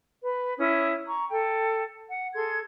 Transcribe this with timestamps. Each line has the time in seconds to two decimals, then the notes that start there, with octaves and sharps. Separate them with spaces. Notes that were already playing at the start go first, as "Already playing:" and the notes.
0.24 B4
0.58 C#4 E4 C#5 D#6
1.06 A#5 C#6
1.30 A4 G5
2.09 F#5
2.34 G#4 A4 C6 G#6